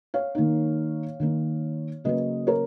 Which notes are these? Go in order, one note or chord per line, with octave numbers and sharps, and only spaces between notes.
C#5 F5
D#3 A#3 D#4
D#3 A#3 D#4
C#3 F#3 A#3 C#4 B4 D#5
A#4 C#5